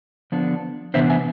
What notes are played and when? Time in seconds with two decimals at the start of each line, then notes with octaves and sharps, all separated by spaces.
0.32 D3 F3 B3 D4
0.94 C3 E3 B3 D4 C5 E5
1.10 E5 G#5